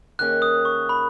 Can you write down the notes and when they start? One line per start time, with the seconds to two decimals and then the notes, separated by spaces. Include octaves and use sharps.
0.19 D#2 D#3 A#3 C#4 G#4 F#6
0.42 D#6
0.65 C#6
0.89 B5